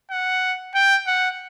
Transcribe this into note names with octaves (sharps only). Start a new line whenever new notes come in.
F#5
G5
F#5